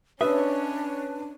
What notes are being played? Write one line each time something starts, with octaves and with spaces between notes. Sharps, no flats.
C#4 D4 B4 C#5 D#5 E5